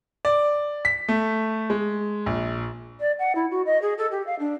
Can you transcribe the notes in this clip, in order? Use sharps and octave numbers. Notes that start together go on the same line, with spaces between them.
D5
B6
A3
G#3
A#1
D5
F#5
E4
F#4
D#5
G#4
A4
G4
F5
D4